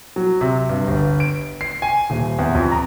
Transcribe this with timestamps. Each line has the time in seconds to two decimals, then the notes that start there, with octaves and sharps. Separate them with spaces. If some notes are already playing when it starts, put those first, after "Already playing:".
0.16 F#3
0.41 C3
0.69 G2
0.87 G1
1.20 D7
1.61 C7
1.82 G#5
2.10 D#1
2.39 E2
2.55 F2
2.71 A#5